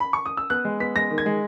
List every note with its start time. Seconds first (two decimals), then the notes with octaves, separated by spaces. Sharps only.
0.00 B5
0.13 C#6
0.26 D#6
0.37 E6
0.50 B3 F#6
0.65 G#3
0.80 B3 B6
0.96 G#3 A#6
1.11 D#3
1.18 G#6
1.26 G#3